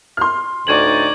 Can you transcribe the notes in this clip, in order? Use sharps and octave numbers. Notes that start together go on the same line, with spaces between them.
C6 F6
D2 A2 D#4 D5 C#6 G#6 F#7